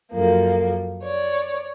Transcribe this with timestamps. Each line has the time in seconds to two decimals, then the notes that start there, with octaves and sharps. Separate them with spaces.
0.12 F#2 F3 A#3 A4
1.04 C#5 D5